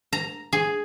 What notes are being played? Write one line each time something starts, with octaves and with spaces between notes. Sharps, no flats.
A#5
G#4